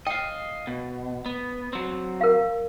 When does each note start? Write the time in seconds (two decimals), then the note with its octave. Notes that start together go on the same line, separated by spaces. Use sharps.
0.07 D#5 F5 G5
0.67 B2
1.26 B3
1.73 F#3 C4
2.21 A#4 F5